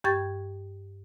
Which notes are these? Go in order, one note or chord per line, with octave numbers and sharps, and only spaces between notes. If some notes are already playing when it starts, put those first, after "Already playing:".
G2 G4 G5 C#6 G#6 A6